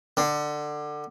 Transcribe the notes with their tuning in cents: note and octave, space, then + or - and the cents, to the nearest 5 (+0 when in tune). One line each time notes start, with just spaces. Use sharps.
D3 +20